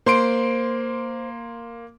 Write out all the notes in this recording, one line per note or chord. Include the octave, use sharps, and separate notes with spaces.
A#3 C5 C6 D7